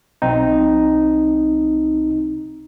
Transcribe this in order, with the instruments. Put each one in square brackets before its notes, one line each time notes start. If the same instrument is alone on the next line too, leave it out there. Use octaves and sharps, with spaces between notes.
[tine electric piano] B1 C4 D#4